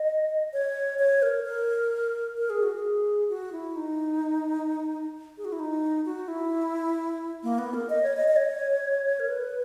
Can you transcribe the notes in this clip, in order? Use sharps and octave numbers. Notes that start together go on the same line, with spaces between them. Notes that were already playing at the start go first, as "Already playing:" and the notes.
Already playing: D#5
C#5
C#5
A#4
A#4
A#4
G#4
F#4
G#4
F#4
E4
D#4
G#4
F#4
E4
D#4
F#4
E4
A#3
B3
A#4
D#5
C#5
D#5
D#5
C#5
A#4
B4